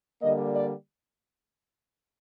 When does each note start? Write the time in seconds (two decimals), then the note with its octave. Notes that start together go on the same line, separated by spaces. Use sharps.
0.22 D3 G3 A#3 D#5
0.54 D5